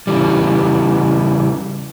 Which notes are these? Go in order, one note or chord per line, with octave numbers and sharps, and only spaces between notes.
C#3 E3 G3